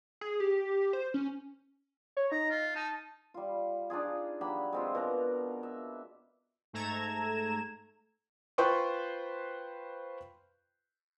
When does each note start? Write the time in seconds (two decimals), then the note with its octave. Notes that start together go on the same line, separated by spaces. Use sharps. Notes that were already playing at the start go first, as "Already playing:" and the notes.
0.21 G#4
0.40 G4
0.93 C5
1.14 C#4
2.17 C#5
2.32 D#4 A#5
2.50 F4
2.76 D#4 A5
3.34 G3 F4
3.90 D4 D#4 F4 G#4
4.41 F#3 D4 G4 B5
4.73 G#3 C4 F4
4.95 B2 A#4
5.63 E5
6.73 G#2 A3 A4 A#5 G#6 E7
8.58 F4 B4 C5 G5 C6 C#6